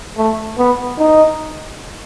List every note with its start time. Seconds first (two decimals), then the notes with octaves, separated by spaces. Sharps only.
0.17 A3
0.58 B3
0.98 D#4